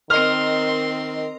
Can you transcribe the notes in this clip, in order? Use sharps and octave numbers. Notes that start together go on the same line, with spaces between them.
D#3 C4 A#4 D#5 C6 F6